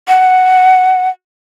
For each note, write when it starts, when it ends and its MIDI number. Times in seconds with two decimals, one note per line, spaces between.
0.08 1.09 78